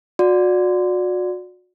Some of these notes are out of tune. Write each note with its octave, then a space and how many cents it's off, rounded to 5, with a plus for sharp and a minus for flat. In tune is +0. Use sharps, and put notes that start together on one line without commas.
F#4 -30 D5 +0